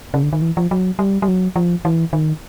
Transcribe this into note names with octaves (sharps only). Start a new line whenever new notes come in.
C#3
D3
D#3
E3
F3
F#3
G3
G3
F#3
F3
E3
D#3